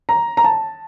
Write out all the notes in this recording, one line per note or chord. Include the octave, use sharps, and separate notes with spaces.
A#5
A#5
A5